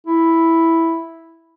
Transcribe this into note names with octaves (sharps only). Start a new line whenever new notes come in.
E4